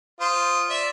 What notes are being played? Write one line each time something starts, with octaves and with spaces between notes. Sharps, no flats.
F4 C5 D#6
D5 E5